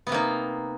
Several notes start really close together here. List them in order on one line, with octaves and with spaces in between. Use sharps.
B3 C3 A#3 D#4